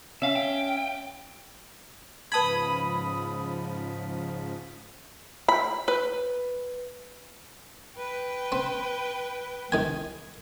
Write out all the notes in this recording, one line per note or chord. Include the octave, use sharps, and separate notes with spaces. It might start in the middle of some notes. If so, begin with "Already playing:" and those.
C#4 E5 F5
G5
G#2 C#3 F3 B4 A5 B5 D#6 G#6
B5
B4
B4 G5
C4
C2 D#3 G#5 G#6